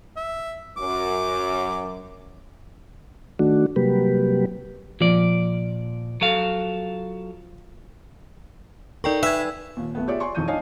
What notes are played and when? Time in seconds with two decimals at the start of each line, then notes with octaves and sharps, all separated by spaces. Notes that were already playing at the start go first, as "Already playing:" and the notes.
0.17 E5
0.77 F#2 D6
3.39 D#3 A3 D4 F#4
3.76 C3 F#3 G3 A#3 G4 B4
5.01 A#2 F3 D5
6.21 F#3 A4 F5
9.04 D#4 A4 A#4 D5 G5 C#6
9.23 D#4 B4 E5 G#6
9.76 D#2 A#2
9.95 B1 A3 B3
10.08 F4 G4 G#4 C#5 D5 E5
10.20 D5 G#5 C6 C#6
10.35 E1 F2 D#4 C#6 G6 D#7
10.48 D4 D#4 C#5 D#5 F5 G#5